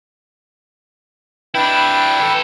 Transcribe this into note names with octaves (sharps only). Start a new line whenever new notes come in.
D4 E4 B4 G5
E3 A4